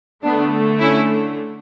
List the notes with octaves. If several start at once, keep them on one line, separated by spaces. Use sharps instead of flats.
D3 A3 B3 D4
C#4 E4